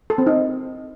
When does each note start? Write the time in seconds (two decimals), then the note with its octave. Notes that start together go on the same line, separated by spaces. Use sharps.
0.10 A4
0.18 C4
0.27 D#4